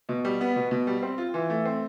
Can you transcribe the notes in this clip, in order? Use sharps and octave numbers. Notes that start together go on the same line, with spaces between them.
B2
G3
B3
B2
B2
G3
C4
F4
E3
A3
C4